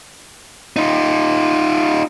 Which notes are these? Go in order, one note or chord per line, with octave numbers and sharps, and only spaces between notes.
D#4 F4